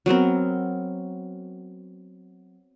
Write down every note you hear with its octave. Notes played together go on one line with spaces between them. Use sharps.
F#3 B3 C4 A#4